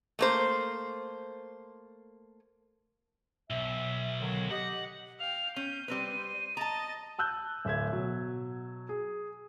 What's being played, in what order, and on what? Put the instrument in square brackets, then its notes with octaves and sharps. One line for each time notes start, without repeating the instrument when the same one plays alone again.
[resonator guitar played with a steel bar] A3 A#3 C5
[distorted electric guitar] B1 [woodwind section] E5
[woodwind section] D3 D#3 F#3
[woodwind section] G4 D#5 [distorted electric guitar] F#5
[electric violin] F5 G5 [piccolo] F7
[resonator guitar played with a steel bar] C#4 [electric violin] G6 [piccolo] D#7
[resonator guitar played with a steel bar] G3 C4 B4 [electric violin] C5
[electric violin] D#5 A6 [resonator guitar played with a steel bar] A5 A#5
[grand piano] A5 E6 F#6 G6
D1 E5 G#6
B2 F#3
G#4